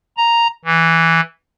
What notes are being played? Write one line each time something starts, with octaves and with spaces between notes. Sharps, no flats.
A#5
E3